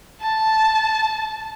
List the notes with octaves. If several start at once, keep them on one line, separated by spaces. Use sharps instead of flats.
A5